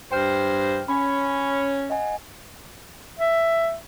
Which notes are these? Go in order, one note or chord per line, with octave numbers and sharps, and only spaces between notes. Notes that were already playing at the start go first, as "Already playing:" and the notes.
G2 C5 G5 F6
C#4 B5
D#5 F#5 G#5
E5